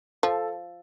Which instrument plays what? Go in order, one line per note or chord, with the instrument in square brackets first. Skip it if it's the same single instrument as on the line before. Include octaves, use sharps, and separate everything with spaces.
[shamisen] F3 [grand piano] A4